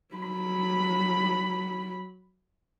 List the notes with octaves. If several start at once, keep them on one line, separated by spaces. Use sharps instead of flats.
F#3 B5